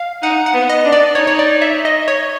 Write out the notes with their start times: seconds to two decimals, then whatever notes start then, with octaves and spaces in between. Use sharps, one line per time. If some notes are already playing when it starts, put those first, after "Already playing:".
Already playing: F5
0.22 D#4 F#5
0.46 F#5
0.54 B3
0.70 D#5
0.84 D4
0.92 D5
1.15 D#4 C#5
1.27 C#5
1.39 D5
1.62 E5
1.85 D#5
2.08 C#5